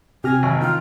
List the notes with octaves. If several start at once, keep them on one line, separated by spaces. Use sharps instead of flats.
C3 G4 G#5 F6 A#6
G#1
D#3 F4 G5